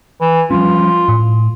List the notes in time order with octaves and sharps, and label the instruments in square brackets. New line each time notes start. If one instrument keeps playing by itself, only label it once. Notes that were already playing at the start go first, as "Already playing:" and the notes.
[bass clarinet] E3
[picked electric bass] F3 G3 C#4 [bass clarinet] F4
[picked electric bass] A2